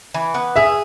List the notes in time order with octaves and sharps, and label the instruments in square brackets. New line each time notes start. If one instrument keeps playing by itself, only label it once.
[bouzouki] E3
B3
[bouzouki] G#4 [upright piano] E5